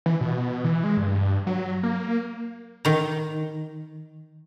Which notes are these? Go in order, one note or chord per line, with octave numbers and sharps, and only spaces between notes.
E3
B2
E3
G#3
G2
F#3
A#3
D#3 A#5